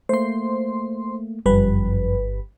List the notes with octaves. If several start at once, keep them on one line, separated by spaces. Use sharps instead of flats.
A3 A#3 C5 C6
G1 F#2 F3 G3 B4